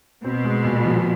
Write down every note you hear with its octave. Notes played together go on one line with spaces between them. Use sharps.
B2 C4
G#3
A#2
F3